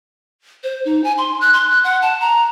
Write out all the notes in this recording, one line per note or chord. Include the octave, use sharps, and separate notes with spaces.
C5
D#4
G#5
C6
F#6
C6
F#6
F#5
A5
A#5